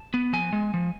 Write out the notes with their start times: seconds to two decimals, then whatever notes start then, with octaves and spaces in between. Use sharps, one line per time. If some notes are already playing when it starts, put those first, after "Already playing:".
Already playing: A5
0.14 B3
0.33 F3 G#5
0.53 G#3
0.74 F3